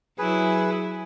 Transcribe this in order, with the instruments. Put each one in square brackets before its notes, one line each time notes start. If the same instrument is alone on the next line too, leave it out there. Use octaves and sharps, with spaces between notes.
[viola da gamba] F#3 E4 [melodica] G#4 B4